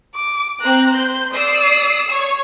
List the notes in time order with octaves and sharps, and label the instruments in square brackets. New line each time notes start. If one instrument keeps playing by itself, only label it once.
[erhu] D6
[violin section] C4 A#5 [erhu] F#6
[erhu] C5 [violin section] G6
[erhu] D5 [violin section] D#6 E6 C7
[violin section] C#5 [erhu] C#6